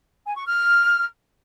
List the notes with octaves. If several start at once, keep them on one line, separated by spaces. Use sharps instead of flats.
G#5
C#6
F6